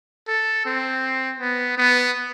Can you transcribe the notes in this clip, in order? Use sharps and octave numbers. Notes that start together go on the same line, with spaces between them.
A4
C4
B3
B3